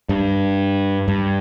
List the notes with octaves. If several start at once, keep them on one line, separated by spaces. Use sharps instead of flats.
G2
G2